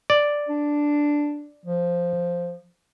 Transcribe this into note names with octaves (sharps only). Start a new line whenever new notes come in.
D5
D4
F3